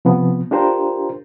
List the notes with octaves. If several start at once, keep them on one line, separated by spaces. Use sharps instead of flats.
C3 F3 B3
D4 F4 G4 A#4 C5